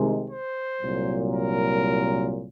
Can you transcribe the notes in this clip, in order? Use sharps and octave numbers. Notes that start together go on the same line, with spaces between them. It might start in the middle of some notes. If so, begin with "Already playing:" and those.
Already playing: C2 C3 D#3 G#3
C5
C2 A#2 F#3
A#4